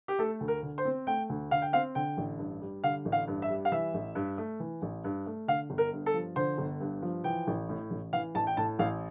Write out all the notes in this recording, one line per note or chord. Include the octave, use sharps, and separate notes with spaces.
G4
A3 A4
D2
A#4
D3
C5
C4
A3 G5
D2
D3 F5
G5
C4 F5
D3 G5
A1
G2
G3
D3 F5
A1
F5
G2
E5
G3
F5
E3 E5
A1
G2
A3
E3
A1
G2
A3
D3 F5
G1
A#4
G2
A4
F3
D3 C5
G1
G2
F3
E3 G5
A1
A2
A1
E3 F5
A1 A5
G5
A2 A5
A1 F5